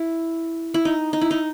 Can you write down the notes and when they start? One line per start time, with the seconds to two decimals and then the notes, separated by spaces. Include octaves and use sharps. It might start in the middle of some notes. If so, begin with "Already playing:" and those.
Already playing: E4
0.74 E4
0.85 D#4
1.13 D#4
1.21 E4
1.31 D#4